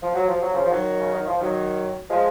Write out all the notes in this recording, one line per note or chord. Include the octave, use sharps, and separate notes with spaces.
F3
F#3
F3
F#3
C#3 F3
F3
D#3 F#3
C#3
D#3
F3
D#3 F#3
F3 G#3